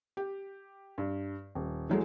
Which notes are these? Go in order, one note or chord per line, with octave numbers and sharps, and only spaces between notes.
G4
G2
D#1
E3 F#3 G#3 A3